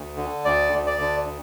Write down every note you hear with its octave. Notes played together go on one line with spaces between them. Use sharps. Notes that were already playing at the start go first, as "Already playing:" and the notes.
Already playing: D2
D3
D2 D5
D2
D5
D3